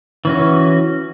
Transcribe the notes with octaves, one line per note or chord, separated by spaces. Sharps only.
E3 C#4 F#4